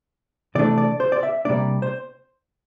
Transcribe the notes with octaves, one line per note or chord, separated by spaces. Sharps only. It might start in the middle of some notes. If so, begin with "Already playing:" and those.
C3 E3 A3 D4 D5
D5
C5
D5
E5
C3 G3 A#3 D4 D5
C5